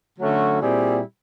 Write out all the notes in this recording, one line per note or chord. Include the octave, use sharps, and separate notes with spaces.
D3 F#3 A3 C#4 F#4
A#2 G3 C4 E4 G#4